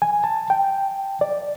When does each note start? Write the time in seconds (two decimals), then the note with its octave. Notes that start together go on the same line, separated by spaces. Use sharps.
0.02 G#5
0.24 A5
0.50 G5
1.21 D5